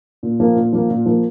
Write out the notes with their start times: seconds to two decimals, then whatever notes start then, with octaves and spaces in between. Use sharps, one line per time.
0.23 A#2
0.40 F3 A#3
0.56 A#2
0.73 F3 A#3
0.90 A#2
1.06 F3 A#3